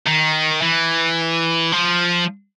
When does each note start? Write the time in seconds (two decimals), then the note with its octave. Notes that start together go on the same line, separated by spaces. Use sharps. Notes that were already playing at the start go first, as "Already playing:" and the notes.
0.06 D#3
0.62 E3
1.72 F3